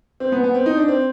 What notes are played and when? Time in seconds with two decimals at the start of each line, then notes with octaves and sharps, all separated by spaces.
0.20 C4
0.32 B3
0.44 B3
0.54 C4
0.66 D#4
0.77 D4
0.88 C4